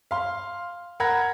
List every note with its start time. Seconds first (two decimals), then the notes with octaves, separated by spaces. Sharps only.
0.11 F5 C6
1.00 A#4 F#5 A#5 B5 G#6 A#6